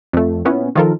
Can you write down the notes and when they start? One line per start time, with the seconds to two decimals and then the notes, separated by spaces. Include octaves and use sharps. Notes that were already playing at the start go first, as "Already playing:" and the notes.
0.13 F2 A3
0.45 A#2 B3 C#4 E4
0.75 D#3 F3 F4 A4 A#4